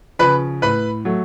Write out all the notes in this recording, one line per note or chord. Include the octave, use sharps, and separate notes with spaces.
C#3 F3 B4 B5
A2 B4 B5
F#3 A3